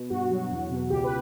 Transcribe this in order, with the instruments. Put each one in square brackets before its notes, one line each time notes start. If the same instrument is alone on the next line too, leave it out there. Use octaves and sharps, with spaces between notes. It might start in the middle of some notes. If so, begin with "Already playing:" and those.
Already playing: [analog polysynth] B2
G2 F#4
F#3
F#4
E2
B2
C#2 G4
B4